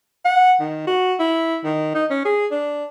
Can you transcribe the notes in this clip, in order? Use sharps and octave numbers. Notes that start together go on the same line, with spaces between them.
F#5
D#3
F#4
E4
D#3
D#4
C#4
G#4
D4